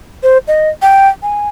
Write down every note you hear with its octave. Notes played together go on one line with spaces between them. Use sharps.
C5
D#5
G5
G#5